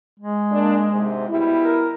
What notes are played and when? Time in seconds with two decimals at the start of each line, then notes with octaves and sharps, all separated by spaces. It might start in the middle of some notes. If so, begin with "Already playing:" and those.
0.19 G#3
0.51 A#3 D4
0.91 G#2 C3
1.28 B2 G3 E4
1.62 A#4